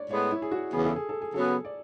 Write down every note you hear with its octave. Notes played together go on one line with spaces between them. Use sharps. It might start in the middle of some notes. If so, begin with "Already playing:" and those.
Already playing: D4 C#5 D5
A2 G#3 B3 C#5
E4
G#4
F#4
E2 C#3 E3 B3 G#4
A4
G#4
A4
G#4
C#3 F#3 B3 A4
D5